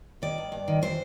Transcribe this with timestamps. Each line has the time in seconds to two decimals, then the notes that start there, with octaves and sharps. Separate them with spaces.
0.22 D#3 D5
0.38 G2
0.52 G2
0.68 D#3
0.82 E3 C5